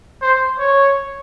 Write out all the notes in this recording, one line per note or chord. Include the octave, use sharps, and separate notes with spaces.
C5
C#5